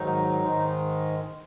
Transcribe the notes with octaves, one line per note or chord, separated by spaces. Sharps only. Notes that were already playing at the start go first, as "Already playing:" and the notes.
Already playing: G#2 D#3 F#3 D#4
G#2 D#3 G#3